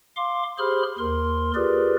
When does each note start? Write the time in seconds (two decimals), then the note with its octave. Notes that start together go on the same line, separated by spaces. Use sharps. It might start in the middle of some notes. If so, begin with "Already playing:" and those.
0.17 F5 C6 D6
0.59 G4 G#4 C5 B5 C6 F6
0.99 D#2 A#4 C6
1.55 F4 G4 G#4 A#4 B4 D5